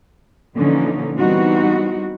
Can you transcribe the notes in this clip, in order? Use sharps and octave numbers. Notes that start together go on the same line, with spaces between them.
A#2 D3 E3 F3 C#4 D#4
E3 G3 B3 C4 D#4 F#4